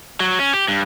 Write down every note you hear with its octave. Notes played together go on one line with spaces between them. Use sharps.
F#3
C#4
G4
G2